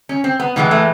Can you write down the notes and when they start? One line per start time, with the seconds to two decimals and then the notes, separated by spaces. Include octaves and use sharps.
0.09 C#4
0.24 C4
0.40 B3
0.56 A2 E3 G#3 B3
0.71 A3